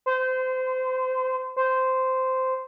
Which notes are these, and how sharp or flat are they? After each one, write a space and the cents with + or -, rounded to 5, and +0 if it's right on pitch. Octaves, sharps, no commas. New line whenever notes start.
C5 -25
C5 -10